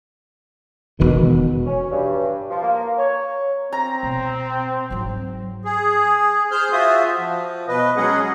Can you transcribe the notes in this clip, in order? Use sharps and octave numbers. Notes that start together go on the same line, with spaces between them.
E1 B2 D#3
C#4
G2
F3
A#3
C#5
C4 A#5
B2
G#2 F#3
G#4
G#4 C5 F6 G6
F4 F#4 C5 E5 D#6
F3
B2 B4 D#5
F#3 G#3 C#4 G#4 D#5 F#5